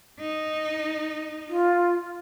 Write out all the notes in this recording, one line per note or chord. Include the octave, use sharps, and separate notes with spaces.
D#4
F4